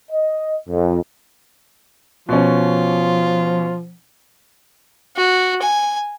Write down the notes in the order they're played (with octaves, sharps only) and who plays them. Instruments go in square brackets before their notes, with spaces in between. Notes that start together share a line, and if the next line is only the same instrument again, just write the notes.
[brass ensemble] D#5
F2
[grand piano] B2 C#4 [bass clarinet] F3 [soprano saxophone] F4
[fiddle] F#4
G#5